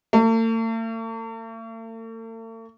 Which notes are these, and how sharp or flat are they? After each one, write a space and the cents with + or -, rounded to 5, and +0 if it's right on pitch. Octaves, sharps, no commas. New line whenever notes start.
A3 +45